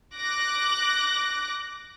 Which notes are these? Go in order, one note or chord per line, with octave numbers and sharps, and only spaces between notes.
D6 F#6 A#6